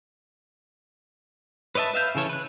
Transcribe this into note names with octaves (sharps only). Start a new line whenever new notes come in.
B4 C#5 D#5 E5 A5
B4 E5 F5 G6
C#3 E3 A4 C#5
B4 F#6